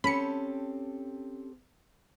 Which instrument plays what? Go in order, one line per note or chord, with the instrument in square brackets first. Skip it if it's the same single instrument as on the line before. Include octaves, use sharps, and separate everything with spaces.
[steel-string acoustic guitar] C4 G4 A4 [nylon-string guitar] C#4 [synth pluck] B5 C#7